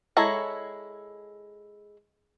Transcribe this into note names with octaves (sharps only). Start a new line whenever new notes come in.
G#3 E4 A4 C#5 A#5